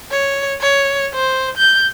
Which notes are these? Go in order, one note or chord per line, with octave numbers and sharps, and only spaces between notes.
C#5
C#5
C5
G6